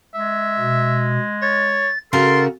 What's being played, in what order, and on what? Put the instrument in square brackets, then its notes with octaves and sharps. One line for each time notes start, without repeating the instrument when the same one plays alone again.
[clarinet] G#3 [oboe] E5
[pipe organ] B2
[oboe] C#5 [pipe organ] A6
[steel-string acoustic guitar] C#3 F#4 A#4 [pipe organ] A4 A6 [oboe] C6